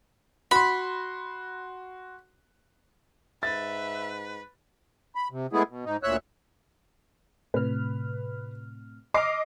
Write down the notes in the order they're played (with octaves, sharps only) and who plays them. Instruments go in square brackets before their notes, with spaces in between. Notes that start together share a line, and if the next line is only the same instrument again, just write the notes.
[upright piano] F#4 C6 [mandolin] B5
[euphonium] G#2 [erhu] B4 [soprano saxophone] E5 [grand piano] A6
[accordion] B5
C3
G#3 A3 B3 E4 G#4
B2
G#2 D#4
D2 A#2 C#5 E5 E6 F#6
[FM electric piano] A2 C3 F6 [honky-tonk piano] B4
[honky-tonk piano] D#5 D6 C7 [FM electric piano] A#5 F6